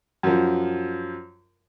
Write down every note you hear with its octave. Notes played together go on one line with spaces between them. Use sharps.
F#2 F3